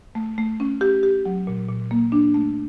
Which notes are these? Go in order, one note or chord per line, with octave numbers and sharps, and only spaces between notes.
A3
A3
C#4
G4
G4
F#3
A#2
A#2
A#3
D4
A3